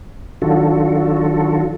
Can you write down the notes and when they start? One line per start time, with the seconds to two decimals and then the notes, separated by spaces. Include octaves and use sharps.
0.42 D#3 F#3 D4 F4 F#4 A4